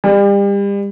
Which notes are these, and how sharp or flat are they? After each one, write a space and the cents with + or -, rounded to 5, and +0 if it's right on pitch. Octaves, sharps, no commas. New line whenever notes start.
G3 +35